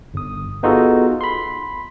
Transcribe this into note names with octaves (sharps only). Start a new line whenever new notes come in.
G1 D#6
B3 D#4 F4 F#4 G#4 A4
B5 C6